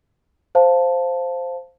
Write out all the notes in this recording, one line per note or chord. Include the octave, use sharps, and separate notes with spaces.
C5 F5 A5